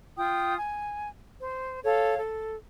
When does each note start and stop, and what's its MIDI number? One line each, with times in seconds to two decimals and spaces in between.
0.17 0.56 65
0.17 0.56 79
0.17 0.56 87
0.57 1.10 80
1.41 1.79 72
1.84 2.17 69
1.84 2.17 73
1.84 2.17 77
2.18 2.55 69